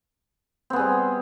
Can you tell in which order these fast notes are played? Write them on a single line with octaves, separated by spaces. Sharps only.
C4 B3 G#4 G3